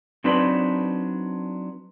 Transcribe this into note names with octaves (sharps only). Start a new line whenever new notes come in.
F#3 C4 D4 D#4 B4